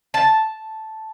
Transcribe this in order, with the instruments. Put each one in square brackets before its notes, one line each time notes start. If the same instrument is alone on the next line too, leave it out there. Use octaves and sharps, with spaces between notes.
[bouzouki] A5